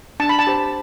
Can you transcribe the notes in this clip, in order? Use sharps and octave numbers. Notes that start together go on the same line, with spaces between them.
D4 A5
B5
A5
G4 C5